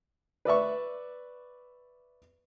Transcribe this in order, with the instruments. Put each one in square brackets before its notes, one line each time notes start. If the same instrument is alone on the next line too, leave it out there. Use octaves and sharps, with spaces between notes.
[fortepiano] B4 D5 E5 C#6